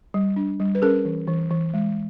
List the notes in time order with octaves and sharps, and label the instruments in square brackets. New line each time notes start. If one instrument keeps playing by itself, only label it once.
[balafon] G3
D4
G3
B4
C#4 G#4 A#4
E3
E3
E3
G#3